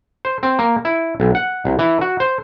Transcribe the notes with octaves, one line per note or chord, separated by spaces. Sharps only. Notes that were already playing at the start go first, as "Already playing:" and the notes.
C5
C4
A#3
E4
B1
F#5
C2
E3
F#4
C5